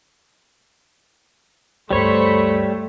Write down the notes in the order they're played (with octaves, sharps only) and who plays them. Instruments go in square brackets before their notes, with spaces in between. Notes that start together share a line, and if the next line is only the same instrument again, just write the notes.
[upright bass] D2 G2 [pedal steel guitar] G3 C#5 [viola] A3 [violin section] C5 B5 C#7